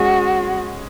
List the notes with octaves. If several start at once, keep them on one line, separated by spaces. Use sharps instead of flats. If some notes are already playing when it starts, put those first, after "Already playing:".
Already playing: G#3 C#4 F#4 G#4